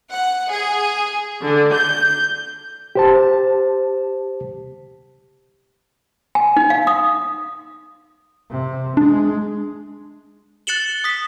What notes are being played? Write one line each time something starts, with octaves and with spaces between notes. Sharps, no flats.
F#5
G#4
D3
G6
G4 C5 A5
G#5
D#4
F5
D#6
C3
G#3 D4
F#6 A6 C#7 E7 F#7 G7
D#6 B6